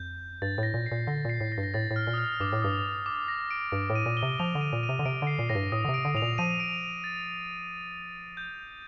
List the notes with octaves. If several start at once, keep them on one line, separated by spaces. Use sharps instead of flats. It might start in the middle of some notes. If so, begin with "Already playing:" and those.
Already playing: F2 G6
G2 A6
A2 A#6
A#2
C7
A#2
D3 A#6
A#2 C7
A2
A#6
G2
A#6
A2 A6
A2
F6
A#2
D#6
F6
G2 D6
A2
G2 D#6
D6
A#6
D7
G2 D7
A2
D#7
A#2
G7
C3
F3 F7
D3
D#7
A#2
D#7
C3
D3
C3 D7
D3 C7
A#2
A2 A#6
G2
A2 D#6
D3
C3
D7
D3
A2 F7
A#2
F3 D#7
D7
A6
G6